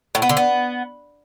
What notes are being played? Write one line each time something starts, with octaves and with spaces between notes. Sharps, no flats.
A2
B3
D3
B3